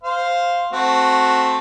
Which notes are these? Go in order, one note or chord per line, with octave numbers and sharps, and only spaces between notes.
C5 F5
A3 C4 F#4